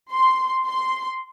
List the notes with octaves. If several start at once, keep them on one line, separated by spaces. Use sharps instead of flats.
C6
C6